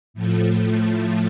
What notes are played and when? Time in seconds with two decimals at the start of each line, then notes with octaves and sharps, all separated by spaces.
0.14 A2 F3 A3